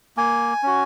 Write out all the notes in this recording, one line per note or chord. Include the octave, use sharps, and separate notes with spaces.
A#3 G#5
C#4 F#4